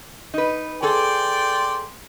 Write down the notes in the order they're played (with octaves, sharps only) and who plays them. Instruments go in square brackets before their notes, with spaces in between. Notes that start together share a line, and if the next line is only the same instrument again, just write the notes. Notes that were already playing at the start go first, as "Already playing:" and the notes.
[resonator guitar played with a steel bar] D#4 B4
[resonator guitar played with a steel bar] G#4 A4 [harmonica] D5 G5 C6